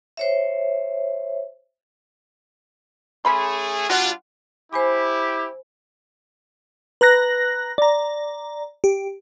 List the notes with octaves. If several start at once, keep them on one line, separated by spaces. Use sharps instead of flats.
C5 C#5 E5
A3 C#4 G#4 B5 C6
G3 D4 F4 F#4 F#5
E4 G4 C5 G#5 B5
B4 A#5 F#6 A#6
D5 A#5
G4